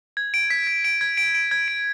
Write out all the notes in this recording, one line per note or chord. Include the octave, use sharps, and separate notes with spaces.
G#6
D7
B6
B6
D7
G#6
D7
D7
G#6
D7